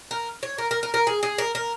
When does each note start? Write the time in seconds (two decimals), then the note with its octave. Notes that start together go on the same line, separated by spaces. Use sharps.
0.11 A#4
0.43 C#5
0.58 A#4
0.71 A#4
0.83 A#4
0.94 A#4
1.07 G#4
1.23 G#4
1.38 A#4
1.55 A#4